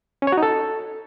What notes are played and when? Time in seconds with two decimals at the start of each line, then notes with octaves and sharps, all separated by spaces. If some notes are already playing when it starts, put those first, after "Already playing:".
0.22 C#4
0.27 C#5
0.32 F#4
0.37 D#4
0.43 A4